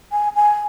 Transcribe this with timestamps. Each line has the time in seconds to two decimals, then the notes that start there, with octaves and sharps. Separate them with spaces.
0.12 G#5
0.36 G#5